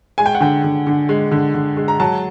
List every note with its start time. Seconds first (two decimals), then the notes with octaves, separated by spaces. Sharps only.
0.18 G#3 G#5
0.26 G5
0.35 F#5
0.40 D3 G5
0.64 D3
0.87 D3
1.09 G#3
1.32 D3
1.54 D3
1.77 G#3
1.88 A#5
2.00 F#3 A5